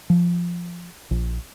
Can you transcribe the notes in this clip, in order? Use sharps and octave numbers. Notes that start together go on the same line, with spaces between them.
F3
A#1